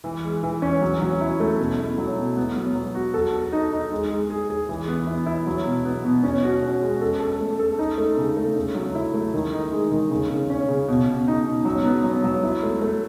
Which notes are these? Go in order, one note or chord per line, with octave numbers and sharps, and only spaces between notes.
E3
G#3
E3
C#4
F#3
F#3
E4
A3
B2
E4
F#3
B2
B3
F#3
F#3
F#4
A4
A4
D#4
D#4
G#3
G#3
G#4
G#4
E3
B3
E4
E4
F#3
B2
B3
B2
C#4
F#4
C#4
G#3
A4
A4
A3
A4
D#4
A3
C#3
A3
C#3
F#3
E4
A3
D#3
D#4
G#3
D#3
C#3
C#3
C#4
C#3
B2
B2
D#4
B2
F#3
B3
F#3
F#3
E4
A3
A3